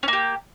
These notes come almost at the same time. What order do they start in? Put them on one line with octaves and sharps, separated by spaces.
C#4 A#3 G4